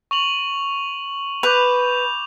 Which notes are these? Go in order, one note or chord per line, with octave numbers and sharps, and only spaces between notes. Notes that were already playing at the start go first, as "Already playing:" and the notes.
C#6 F7 F#7
B4 D6 G6 F7